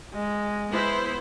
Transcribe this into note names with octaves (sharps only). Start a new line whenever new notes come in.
G#3
B3 E4 C5